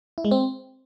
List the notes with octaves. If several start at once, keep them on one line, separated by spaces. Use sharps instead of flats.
E4
G#3
C4